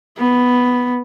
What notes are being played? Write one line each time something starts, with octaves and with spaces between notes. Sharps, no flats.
B3